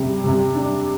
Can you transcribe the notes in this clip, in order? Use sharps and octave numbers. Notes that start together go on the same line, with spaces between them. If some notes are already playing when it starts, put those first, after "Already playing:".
Already playing: C3 G3
C3
D4